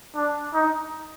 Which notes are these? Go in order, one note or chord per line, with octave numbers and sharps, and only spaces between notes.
D4
D#4